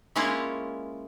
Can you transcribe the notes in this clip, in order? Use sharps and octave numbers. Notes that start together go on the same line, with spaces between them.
G#3 A#3 C#4 E4 F4 C#5